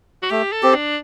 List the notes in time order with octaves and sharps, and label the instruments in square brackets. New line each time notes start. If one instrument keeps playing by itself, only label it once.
[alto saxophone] F#4
[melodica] A3 [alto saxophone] G4
[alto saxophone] A4
[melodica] C4 G4
[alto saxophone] D4